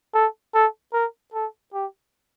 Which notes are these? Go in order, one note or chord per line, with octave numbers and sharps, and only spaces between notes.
A4
A4
A#4
A4
G4